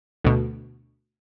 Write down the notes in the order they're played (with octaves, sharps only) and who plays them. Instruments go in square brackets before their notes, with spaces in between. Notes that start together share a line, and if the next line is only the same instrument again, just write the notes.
[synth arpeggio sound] D2 B2